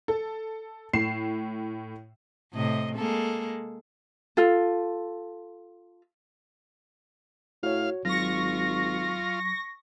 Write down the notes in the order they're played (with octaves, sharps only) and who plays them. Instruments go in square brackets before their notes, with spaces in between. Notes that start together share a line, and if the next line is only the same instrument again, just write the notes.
[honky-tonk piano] A4
A2 C7 E7
[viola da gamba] A2 C3 D#5
G#3 A#3 A4
[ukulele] F4 A4
[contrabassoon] A2 [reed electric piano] F#4 C#5 [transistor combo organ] F5
[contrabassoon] G#1 [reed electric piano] F#3 [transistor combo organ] F4 [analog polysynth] C#6 A#6